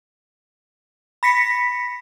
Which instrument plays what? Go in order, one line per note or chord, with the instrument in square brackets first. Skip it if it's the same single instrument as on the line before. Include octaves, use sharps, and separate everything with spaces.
[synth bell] B5 A#6 B6 C#7